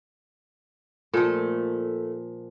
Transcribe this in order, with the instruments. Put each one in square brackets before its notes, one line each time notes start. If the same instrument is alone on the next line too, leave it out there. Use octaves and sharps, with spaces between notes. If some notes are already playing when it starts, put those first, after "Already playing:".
[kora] A#2 F3 [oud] A3 A4